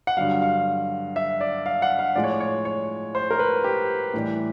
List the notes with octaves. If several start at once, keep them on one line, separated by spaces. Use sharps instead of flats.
F#5
G2 D3 F#3 F5
F5
E5
D5
F5
F#5
F5
A2 F3 G#3 D5
C#5
D5
C#5
C#5
C5
A#4
B4
G4
A2 E3 G3